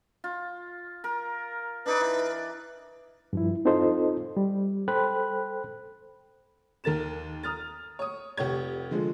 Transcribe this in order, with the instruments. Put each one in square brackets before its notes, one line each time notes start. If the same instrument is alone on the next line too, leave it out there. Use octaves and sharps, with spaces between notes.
[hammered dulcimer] F4
A#4
[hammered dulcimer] D4 D#4 D5 [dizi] B4
[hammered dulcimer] E3
[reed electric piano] G2 F3 E4
C4 D#4 F4 A4 C5 D#5
G3
A4 C5 G5 B5 F#6
[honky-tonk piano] D#2 A#4 A6 E7
A#5 D#6 F6 A6
C#5 D#6
F1 G4 C#5 G#6
D3 F3 G#3 A4